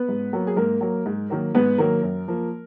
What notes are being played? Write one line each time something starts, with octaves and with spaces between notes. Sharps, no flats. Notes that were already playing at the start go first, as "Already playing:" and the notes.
Already playing: B3 B4
G#2
F#3 A#3
G#4
G#2 A#3 A#4
F#3 A#3
G#2
D#3 F#3 A#3
G#2 B3 B4
D#3 F#3 A#3 A#4
F#2
F3 A#3